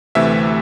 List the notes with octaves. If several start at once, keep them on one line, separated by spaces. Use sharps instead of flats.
D2 C3 E3 A3 E5